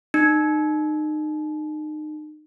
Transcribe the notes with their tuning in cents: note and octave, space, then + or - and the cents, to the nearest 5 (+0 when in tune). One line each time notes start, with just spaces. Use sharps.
D#4 -30